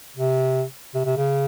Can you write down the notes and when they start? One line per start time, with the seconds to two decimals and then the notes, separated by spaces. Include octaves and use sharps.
0.17 C3
0.95 C3
1.06 C3
1.17 C#3